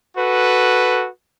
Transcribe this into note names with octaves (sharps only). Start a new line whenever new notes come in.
F#4 A4 B4